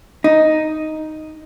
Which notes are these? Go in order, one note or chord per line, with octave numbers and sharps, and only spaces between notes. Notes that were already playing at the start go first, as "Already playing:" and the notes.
D#4